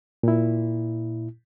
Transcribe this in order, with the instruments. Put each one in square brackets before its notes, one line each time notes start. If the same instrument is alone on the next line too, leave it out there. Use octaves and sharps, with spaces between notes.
[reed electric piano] A#2 E4